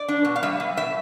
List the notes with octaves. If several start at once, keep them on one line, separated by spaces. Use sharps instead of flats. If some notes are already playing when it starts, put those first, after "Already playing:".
Already playing: D5
D4
B2
F5
G3 E5
G3
B2 E5